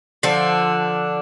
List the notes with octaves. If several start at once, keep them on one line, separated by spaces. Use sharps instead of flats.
D3 F3 D4